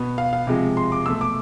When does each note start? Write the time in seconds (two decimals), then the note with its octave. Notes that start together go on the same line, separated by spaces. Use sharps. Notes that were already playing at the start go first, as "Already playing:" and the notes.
Already playing: B2 B3
0.18 F5
0.33 F5
0.47 C3 F3 G#3
0.77 C6
0.92 D6
1.06 B2 E6
1.09 A3
1.21 D6